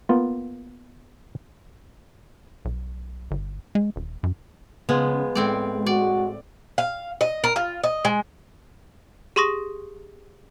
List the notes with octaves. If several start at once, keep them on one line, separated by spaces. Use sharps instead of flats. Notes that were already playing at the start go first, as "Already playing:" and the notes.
A#3 B3 F4
B1
G1
G#3
D#1
F#2
C#3 F3 G#3 B3
A2 G#3 C4 D5
F#4 D5
F5
D#5
A#4
F4
D#5
G#3
G4 G#4 C6 C#6 D#6 A#6